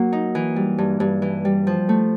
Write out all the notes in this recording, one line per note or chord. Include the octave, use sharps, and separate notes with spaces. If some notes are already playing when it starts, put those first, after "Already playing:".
Already playing: F#3 A#3 F#4
D#4
E3
G3
G2
G2
E3
G3
F3
A3